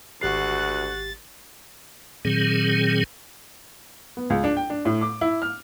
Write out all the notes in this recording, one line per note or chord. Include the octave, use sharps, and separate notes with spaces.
G#1 D2 F#4 G4 F#6 A6 C7
A#2 D#3 F#3 C4 G#4
B3
C#2
D4
G5
D4
A2
D6
E4
F6